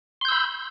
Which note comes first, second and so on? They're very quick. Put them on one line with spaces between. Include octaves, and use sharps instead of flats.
C6 G6 E6 B5